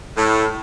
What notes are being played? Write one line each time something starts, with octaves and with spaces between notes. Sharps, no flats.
A2